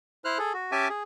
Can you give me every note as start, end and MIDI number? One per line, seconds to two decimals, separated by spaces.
0.25 0.38 64
0.25 0.38 72
0.25 0.38 89
0.25 0.38 90
0.38 0.53 68
0.38 0.53 69
0.53 0.71 66
0.72 0.88 61
0.72 0.88 67
0.72 0.88 76
0.72 0.88 80
0.72 0.88 81
0.72 0.88 86
0.90 1.03 68